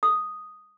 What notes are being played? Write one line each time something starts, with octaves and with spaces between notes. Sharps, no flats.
D#6